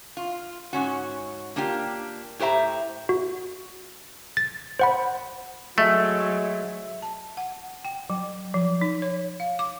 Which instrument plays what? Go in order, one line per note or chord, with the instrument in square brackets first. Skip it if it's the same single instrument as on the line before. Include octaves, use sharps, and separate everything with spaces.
[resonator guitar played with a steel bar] F4
G#2 C#4 F#4
A#3 D4 F4 G4
A2 G4 C5 E5 A#5
[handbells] F#4
A6
C5 F#5 B5
[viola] F#3 [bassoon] G#3 [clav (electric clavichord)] A3 [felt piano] E5
[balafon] A5
F#5
G5
F#3
F3
D#4
C#5
F5
D6